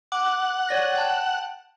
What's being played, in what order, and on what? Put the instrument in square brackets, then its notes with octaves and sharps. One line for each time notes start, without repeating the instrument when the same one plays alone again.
[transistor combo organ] F#5 [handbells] D6
[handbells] C#5 D5 A#6
G5 A5